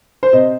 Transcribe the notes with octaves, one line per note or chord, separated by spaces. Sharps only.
C5
C3 D#5